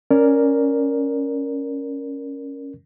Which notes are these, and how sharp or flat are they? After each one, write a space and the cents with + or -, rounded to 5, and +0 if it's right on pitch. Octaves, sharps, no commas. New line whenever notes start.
C#4 +0 A#4 +0 D5 +0